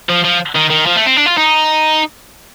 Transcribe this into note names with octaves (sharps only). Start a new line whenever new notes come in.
F3
F3
D#3
D#3
F3
A3
C4
D4
F4
D#4